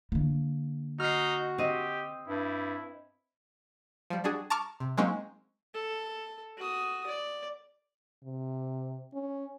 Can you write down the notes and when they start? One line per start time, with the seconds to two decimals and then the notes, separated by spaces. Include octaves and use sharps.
0.12 D3 A#3
1.00 D#4 F#4 F6 C7
1.58 C4 G4 D#5
2.28 G2 E4
4.10 F3 G3
4.24 G3 D4 F#4 G#4
4.50 A5 A#5 C#6 D6 F6
4.80 C3
4.97 F#3 G#3 A#3 C4 C#4 D#4
5.74 A4
6.58 F#4 D#6
7.07 D5
8.24 C3
9.14 C#4